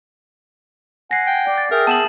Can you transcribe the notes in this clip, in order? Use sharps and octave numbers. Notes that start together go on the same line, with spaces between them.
F#5 G#5 A#6 C7
G5
D5
A6
G#4 A#4 E5 G5
B3 A5 E7 F#7